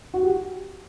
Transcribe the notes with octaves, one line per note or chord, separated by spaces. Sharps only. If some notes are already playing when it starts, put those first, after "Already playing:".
F#4
G4